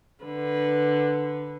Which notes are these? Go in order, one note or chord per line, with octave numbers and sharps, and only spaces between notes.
D3 B4